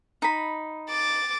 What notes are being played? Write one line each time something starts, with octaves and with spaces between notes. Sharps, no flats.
D#4 B5
D6 A6